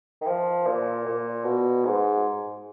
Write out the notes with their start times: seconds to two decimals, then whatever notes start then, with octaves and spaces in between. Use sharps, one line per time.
0.21 D#3
0.26 F3
0.66 A#2
1.06 A#2
1.44 B2
1.84 G#2